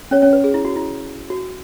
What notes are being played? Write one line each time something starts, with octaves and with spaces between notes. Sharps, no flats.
C#4 C#5
C#4 C#5
B4
G#4
E4
F#4
E4
F#4